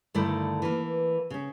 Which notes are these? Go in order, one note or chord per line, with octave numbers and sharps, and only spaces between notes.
G2 D3 D#3 A3 E4 D5
E3 A#3
C#3 C#4